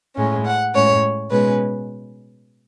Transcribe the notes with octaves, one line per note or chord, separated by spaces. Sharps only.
A2 G#3 C#4
F#5
A2 G#3 C#4 C#5
B2 G#3 C#4 B4